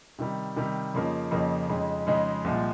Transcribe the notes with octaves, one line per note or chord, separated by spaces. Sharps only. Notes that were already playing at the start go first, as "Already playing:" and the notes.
C3 D#3 G3
C3 D#3 G3
F2 C#3 F3 A#3 D#4
F2 C#3 F3 A#3 D#4
F2 C#3 G#3 D#4
F2 C#3 G#3 D#4
C2 A#2 F3 G#3